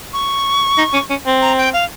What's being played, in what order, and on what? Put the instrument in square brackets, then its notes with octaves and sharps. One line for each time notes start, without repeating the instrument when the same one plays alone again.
[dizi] C#6
[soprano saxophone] D#4
C#4
C#4
C4
[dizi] A#5
G5
F5